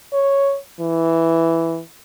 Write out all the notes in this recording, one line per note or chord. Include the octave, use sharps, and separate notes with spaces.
C#5
E3